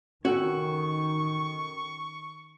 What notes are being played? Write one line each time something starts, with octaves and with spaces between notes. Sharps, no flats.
D#3 C#4 F#4 A4 G5 C#6